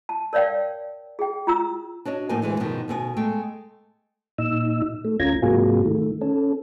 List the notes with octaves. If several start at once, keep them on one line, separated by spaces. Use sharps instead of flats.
A5
A#4 C#5 D5 F5 G5
G#4 G5
F4 A#5 E6
D4 F#4 C#5 D#5
A2 F3 A#3 D#4 D#5 G#5
D2 E3 G#3
G2 B2 D#3 F3
D2 B2 G4 G#5
G#3 A3 G5
A#2 D#4 E6
A3
D2 C#4 F4 A#5 G#6
G#2 C3 F#3 A#3 F4 G#4
D#3 A3
C#4 A4